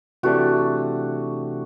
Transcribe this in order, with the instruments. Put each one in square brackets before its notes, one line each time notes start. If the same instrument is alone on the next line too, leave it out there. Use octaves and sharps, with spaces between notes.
[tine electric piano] C3 E3 A3 D4 G4 [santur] F#4